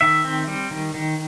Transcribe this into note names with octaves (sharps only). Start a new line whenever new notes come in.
D#3 E5
C4
G3
D#3
D#3